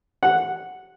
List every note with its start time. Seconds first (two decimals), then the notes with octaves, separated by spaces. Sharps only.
0.23 F#5